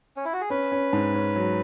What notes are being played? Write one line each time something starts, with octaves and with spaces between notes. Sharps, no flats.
C#4
E4
F#4
G#4
C#4 B4
C#4
G#2
C#4
F#3